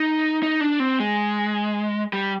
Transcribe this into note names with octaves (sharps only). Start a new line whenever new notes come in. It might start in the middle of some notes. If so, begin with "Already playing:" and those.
Already playing: D#4
D#4
D4
C4
G#3
G3